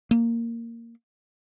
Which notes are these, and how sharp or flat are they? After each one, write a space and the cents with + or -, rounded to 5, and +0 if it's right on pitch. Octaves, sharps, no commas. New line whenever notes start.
A#3 -10